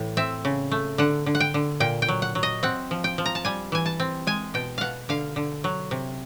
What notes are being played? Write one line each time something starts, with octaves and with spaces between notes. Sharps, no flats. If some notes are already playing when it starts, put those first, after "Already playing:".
Already playing: A2 E3
C4 E5
C#3
A3
D3 F#5
D3
F#5
G5
D3
A#2 G5
G5
F#3
F#5
F#3
D#5
C4 F#5
F3
G5
F3
A#5
A5
G3 G#5
E3 G#5
A5
C4
G#3 G#5
B2 G5
B2 F5 F#5
D3 F5
D3
F#3
C3